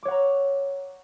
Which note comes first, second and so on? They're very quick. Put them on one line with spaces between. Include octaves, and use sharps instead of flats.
D6 C#5 F#5 A#5 E6